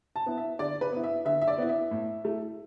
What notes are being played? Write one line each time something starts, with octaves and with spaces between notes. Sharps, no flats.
A5
B3 E4
E5
D3 D5
B4
B3 E4
E5
D3 E5
E5
D5
B3 E4
E5
A2
A3 E4